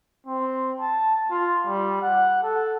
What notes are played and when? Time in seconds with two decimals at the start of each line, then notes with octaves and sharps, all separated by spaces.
0.26 C4
0.80 A5
1.30 F4
1.66 G3
2.02 F#5
2.43 A4